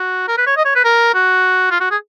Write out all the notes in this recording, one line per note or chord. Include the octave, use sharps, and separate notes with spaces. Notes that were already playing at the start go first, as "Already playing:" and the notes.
Already playing: F#4
A#4
B4
C#5
D#5
C#5
B4
A#4
F#4
F4
F#4
G#4